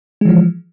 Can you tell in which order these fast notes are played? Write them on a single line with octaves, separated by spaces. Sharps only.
G#3 E3 F3